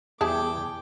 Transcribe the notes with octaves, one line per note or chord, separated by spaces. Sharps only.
E2 G3 E4 G#4 G5 A5 D6